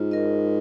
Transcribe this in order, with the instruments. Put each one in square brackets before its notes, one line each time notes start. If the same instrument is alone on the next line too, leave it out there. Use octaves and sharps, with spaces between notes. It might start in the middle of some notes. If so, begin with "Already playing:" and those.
Already playing: [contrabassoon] G#2 [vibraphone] F4
[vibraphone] A#4 D#5